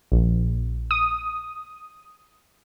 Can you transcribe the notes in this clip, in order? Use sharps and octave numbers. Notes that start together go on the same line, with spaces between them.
A#1
D#6